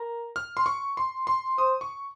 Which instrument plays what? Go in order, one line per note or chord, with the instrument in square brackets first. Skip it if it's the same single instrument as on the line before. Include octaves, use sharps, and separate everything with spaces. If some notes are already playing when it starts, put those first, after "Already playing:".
Already playing: [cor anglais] A#4
[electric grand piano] F6
C6
C#6
C6
C6
[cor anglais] C5 [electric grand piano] D#6
[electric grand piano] C#6